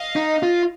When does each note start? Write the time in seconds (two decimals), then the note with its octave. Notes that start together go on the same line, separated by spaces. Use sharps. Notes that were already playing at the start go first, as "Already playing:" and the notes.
Already playing: D#5 F5
0.16 D#4
0.43 F4